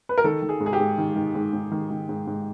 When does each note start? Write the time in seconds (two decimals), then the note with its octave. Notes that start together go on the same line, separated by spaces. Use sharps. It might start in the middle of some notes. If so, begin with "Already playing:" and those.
0.09 B4
0.18 A#4
0.24 D#3 A4
0.42 D#3
0.49 G#4
0.60 G#2
0.66 G#4
0.73 G4
0.80 G#2
0.98 D#3
1.16 D#3
1.35 G#2
1.53 G#2
1.72 D#3
1.90 D#3
2.09 G#2
2.27 G#2